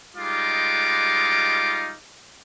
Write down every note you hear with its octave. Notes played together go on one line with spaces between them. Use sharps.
G3 G#3 D#4 F4 D6